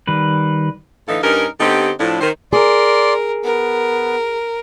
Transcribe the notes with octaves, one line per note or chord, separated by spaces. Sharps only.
D#3 G3 B4
A2 D3 E3 D#4 A4 F5
G2 C#4 D#4 A#4
D3 B3 C4 D#4 G4
A2 F3 D4
D#3 C5
G#4 A#4 D5 C6
B3 A#4